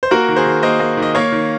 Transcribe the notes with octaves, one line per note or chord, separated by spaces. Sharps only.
C5
A#3 F#4 A#4
D#3
G#4 C5
D#3
A#3 C5 D#5
A#3
D#3
D#5
A#3 C#5 F5
D#3